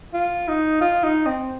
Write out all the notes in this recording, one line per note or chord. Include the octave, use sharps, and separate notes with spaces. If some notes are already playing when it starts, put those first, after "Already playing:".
F4
D#4
F4
D#4
C4